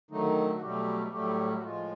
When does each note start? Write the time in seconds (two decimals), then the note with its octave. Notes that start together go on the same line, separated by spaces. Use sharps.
0.11 D3 D#3 F#3 A3 D#4
0.55 F#4
0.62 B2 F#3 G3 A3 G4
1.12 A2 F#3 G3 A3 G4
1.58 F#4
1.64 A2 F3 G#3 F4